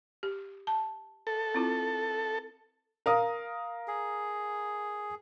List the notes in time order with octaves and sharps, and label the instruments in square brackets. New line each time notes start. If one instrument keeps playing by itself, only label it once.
[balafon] G4
A5
[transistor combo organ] A4
[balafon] C4 E4 F4
[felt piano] A#4 F5 D#6
[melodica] G#4